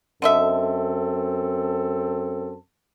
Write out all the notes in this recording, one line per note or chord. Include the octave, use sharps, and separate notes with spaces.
F#2 D3 C4 A4 D#5 E5